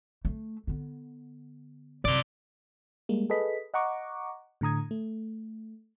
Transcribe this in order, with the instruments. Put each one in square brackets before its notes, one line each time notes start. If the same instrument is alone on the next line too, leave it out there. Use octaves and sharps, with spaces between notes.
[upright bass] A3
D3 B3
[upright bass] F#2 [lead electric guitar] C3 D5
[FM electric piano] G3 G#3 A#3
G#4 A4 B4 D#5 B6
D#5 F#5 A#5 C#6 D6
A2 D3 A#5 D#6 G#6
A3